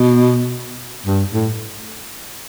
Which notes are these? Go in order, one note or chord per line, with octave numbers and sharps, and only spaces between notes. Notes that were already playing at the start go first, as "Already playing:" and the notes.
Already playing: B2
G2
A2